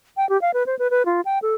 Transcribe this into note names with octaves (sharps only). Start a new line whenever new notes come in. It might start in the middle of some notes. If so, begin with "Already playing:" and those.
G5
G4
F5
B4
C5
B4
B4
F4
G5
A4